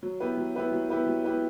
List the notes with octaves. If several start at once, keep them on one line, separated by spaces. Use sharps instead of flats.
F#3
B3 E4 G4 B4
F#3
B3 E4 G4 B4
F#3
B3 E4 G4 B4
F#3
B3 E4 G4 B4